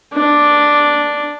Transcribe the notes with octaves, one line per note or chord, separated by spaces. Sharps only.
D4